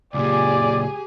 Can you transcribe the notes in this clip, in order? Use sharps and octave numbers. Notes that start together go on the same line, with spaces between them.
C#2 A#2 G4 G#4 D5 G#5